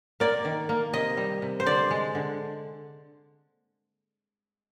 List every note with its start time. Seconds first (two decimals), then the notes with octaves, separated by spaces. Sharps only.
0.20 A#3 D5
0.45 D#3
0.69 A#3
0.93 C3 D#5
1.17 G3
1.42 C3
1.60 C5
1.66 D3 D5
1.91 G#3
2.15 D3